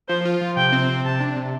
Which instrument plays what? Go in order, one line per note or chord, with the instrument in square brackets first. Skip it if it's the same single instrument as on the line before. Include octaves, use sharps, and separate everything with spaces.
[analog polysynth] F3 [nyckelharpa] C5
[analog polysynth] F4
F3
[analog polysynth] C3 [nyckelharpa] G5
[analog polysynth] C4
C3
[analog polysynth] C3 [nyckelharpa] A5
[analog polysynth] D4
C3